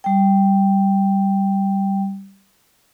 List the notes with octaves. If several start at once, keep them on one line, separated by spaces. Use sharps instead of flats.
G3 G5